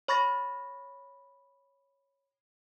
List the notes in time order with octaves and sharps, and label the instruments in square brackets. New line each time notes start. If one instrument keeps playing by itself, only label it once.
[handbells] C#5 B5 C#6 A6 A#6